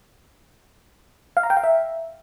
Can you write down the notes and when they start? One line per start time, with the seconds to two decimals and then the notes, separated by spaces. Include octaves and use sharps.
1.37 F5
1.43 A#5
1.50 G5
1.57 F5
1.64 E5